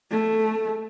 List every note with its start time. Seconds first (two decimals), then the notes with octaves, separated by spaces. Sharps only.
0.11 A3